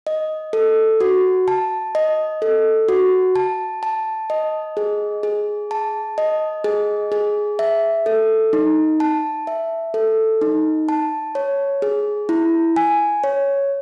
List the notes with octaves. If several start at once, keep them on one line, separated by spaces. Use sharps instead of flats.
D#5
A4
F#4
A5
D#5
A4
F#4
A5
A5
D#5
G#4
G#4
A5
D#5
G#4
G#4
E5
A4
D#4
A5
E5
A4
D#4
A5
C#5
G#4
E4
G#5
C#5